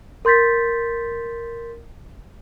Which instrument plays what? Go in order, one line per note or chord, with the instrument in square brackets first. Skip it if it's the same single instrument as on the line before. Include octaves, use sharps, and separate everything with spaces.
[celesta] A#4 C6 G6 A6 B6